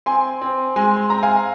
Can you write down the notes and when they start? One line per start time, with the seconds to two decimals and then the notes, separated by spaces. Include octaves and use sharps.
0.06 C4 G#5 C6
0.42 C4
0.76 G#3 G#5 C6
0.96 C6
1.10 C4 A#5
1.23 F5 G#5